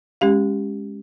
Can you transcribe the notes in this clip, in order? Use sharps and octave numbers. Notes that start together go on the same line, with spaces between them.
G#3 C#4 G4 F5